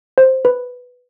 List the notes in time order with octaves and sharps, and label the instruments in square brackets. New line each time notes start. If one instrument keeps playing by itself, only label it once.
[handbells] C5
B4